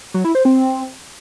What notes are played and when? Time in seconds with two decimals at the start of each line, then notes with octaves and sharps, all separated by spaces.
0.14 F#3
0.25 E4
0.35 C5
0.45 C4